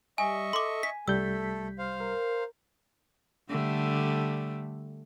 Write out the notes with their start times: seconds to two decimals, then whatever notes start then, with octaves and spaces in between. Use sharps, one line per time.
0.18 G3 D#5 E5 G#5 C#6
0.53 A4 C6 D6
0.83 G#5 B6
1.08 C2 G3 A3 A4 E6 G6 B6
1.78 C5 F5 F6
2.00 A#4
3.50 D3 G3 A3